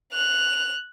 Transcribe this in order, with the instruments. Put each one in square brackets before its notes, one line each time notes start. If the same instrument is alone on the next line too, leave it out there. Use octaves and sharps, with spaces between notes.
[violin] F#6 F7